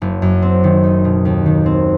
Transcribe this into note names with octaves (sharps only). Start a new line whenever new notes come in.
F#1
F#2
C4
D#3
D#4
B2
D#2
D#3
C4